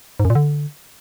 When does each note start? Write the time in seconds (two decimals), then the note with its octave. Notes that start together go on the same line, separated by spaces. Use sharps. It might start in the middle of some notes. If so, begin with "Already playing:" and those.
0.20 G#2
0.25 F#2
0.30 A#2
0.35 D3